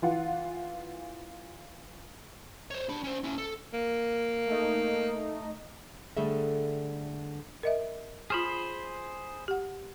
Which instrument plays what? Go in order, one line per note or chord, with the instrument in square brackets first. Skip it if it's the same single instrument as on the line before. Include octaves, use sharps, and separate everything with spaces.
[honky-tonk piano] E3 F4 F#5
[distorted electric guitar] C5 C#5
D4 B5
C#4 C5
C#4 E4
A4
[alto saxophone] A#3
[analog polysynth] A3 D#4
[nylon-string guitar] D3 G3 A3 G#4 A4 E5
[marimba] A#4 D#5 E5
[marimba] F4 F6 [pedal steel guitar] G#4 C5 B5
[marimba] G4 F#5